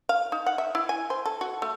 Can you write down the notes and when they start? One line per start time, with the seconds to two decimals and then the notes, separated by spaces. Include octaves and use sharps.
0.09 F5
0.32 D#4
0.46 F#5
0.58 E5
0.75 E4
0.89 G#5
1.10 C5
1.26 A4
1.41 F#4
1.62 A3